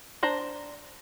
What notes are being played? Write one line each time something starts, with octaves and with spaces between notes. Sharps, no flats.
D4 C5 A#5